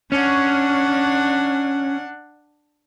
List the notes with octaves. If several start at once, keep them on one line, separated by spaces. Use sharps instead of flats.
C#4 D4 F#5